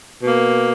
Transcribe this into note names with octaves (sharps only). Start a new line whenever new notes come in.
B2 A#3